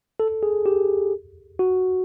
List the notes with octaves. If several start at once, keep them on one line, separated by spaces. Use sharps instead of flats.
A4
G#4
G4
F#4